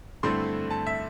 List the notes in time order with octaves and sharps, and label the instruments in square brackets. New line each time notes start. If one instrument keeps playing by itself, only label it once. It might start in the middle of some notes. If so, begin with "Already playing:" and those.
[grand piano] G2 D3 A3 C4 E4 C6
A5
E5